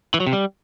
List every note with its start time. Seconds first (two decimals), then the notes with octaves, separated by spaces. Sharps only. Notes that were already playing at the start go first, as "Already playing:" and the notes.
0.14 E3
0.20 F#3
0.27 C3
0.33 G3